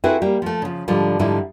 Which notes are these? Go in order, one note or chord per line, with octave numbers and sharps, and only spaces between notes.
C4 E4 F#4 G#4 A4 B4
G3 A#3 G4
F3 A3
C#3 F3
G#2 D3 F3 G3
G#2 D3 F3 G3 E4